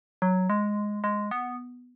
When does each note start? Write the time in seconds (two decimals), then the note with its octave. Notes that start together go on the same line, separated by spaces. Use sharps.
0.22 F#3
0.50 G#3
1.04 G#3
1.31 B3